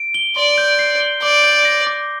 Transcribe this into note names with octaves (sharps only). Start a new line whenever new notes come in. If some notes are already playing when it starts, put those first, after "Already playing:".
Already playing: D7
G7
D5 C6
G6
C7
G7
D5 D6
G6
A#6
D6